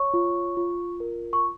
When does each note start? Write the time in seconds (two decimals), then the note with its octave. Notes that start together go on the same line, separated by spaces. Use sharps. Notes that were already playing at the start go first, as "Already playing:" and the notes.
Already playing: C#5 C#6
0.14 F4
0.57 F4
1.00 A#4
1.33 C#6